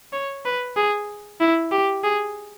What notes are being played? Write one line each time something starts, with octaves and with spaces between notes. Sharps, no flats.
C#5
B4
G#4
E4
G4
G#4